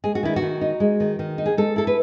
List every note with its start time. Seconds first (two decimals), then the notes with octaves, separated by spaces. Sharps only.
0.04 G#3 G#4
0.15 F#4
0.23 D#3 E4
0.36 F#4
0.42 D#3
0.61 D#4
0.80 G#3
1.00 D#3
1.19 D#3
1.38 D#4
1.46 G#4
1.58 G#3 A4
1.76 E4 A4
1.87 B4